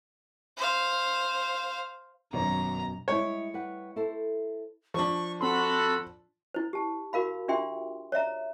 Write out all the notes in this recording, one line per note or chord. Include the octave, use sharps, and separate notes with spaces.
C5 F5
G#1 F#2 B2 C#5 A#5
G3 G#3 E4 C#5
G3 B4 F#5
E4 A4 C5
F3 D4 C#6
C4 F#4 A4 B5 C6
E4 C5
G4 A5
F#4 A#4 F5 B5
D4 F4 G4 E5 G5 C6
C#5 D5 E5 A#5